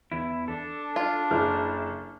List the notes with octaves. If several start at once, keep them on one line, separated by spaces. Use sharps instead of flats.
E2 E4
D4 A4
F4
F#1 E4 F6